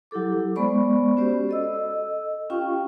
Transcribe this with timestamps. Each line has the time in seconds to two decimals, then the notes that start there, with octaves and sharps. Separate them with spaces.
0.11 F#3 E4 G4 A4 D6
0.56 G#3 B3 C5 D5 B5 C#6
1.17 C#4 F#4 G4 C5 D5
1.49 A4 D#5 E6
2.50 C#4 F4 G4 F5 G5 C#6